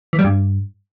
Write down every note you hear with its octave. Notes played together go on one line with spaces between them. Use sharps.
E3
G3
G2